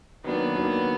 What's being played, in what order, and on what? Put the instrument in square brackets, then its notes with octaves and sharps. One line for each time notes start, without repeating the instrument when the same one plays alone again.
[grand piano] D#3 F#3 A#3 D4 [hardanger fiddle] B3
[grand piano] D#3 F#3 A#3 D4